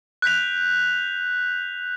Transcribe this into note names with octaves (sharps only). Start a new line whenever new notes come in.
F#6 G6 B6 F7